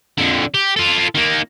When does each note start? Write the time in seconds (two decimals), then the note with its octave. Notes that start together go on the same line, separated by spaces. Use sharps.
0.18 F2 D3
0.54 G4
0.76 F4 A4
1.15 D#3 A#3